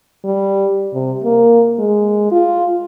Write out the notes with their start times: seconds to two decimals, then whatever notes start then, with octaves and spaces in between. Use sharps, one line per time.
0.24 G3
0.93 C3
1.24 A#3
1.79 G#3
2.31 F4